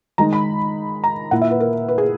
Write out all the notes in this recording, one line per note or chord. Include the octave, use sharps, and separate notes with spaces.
D#3 G#3 D#4 A#5
B5
A#5
A#2 A#3 E4 F#5
E5
B4
A#4
B4
G#4